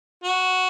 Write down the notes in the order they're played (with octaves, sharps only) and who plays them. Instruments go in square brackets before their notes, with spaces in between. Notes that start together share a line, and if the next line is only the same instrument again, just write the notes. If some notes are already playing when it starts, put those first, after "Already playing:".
[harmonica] F#4